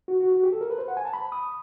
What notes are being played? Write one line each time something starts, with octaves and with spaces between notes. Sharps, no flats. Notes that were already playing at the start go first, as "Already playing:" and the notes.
F#4
F#4
F#4
G4
A4
A#4
B4
C5
F#5
G#5
A5
B5
D#6